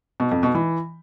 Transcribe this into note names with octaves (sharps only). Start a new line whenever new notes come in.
B2
F2
B2
E3